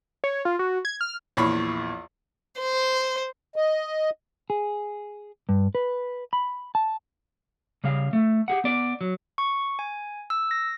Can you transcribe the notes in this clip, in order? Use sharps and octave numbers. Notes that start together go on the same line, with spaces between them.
C#5
F4
F#4
G#6
F6
A#1 E2 C#5 B5 C#6
C5
D#5
G#4
G2
B4
B5
A5
C#3 G3 G#4 F5
A3
G4 G#4 F#5
B3 D5
F#3
C#6
G#5
E6
A#6